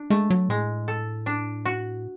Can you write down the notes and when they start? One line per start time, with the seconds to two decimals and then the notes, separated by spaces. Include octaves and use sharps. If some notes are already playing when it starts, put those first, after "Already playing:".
Already playing: D4
0.10 G#3 A3
0.30 F#3
0.49 A2 G#3
0.88 A4
1.26 D4
1.65 F#4